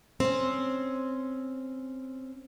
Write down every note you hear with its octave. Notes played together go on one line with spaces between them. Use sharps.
C4 C#4